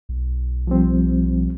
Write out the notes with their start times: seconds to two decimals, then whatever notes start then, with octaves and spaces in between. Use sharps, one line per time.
0.09 B1
0.67 F3 G3 C4